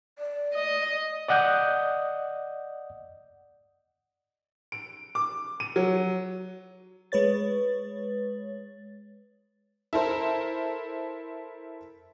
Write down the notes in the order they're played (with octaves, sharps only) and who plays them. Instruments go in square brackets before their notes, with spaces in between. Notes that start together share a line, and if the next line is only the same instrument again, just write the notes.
[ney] D5
[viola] D#5
[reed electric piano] D5 D#5 F#5 D#6 G6
[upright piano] D7
D6
D#7
F#3
[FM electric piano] G#3 B4 C#5 A6
[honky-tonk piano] E4 A4 A#4 C5